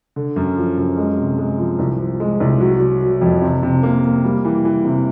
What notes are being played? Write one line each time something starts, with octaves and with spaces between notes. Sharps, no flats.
D3
F#2
F3
F#2
G#3
C3
G#3
F3
C2
F3
G#3
C2
F#3
F#3
F#3
F2
C3
C3
A#3
A#3
G3
E3
E3
C3